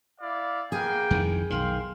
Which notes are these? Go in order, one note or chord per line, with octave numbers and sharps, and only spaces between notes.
E4 D5 F5
A#3 B3 G#4 G5 G#5
F2 D#3 E3
B1 D#3 F5 G5 C6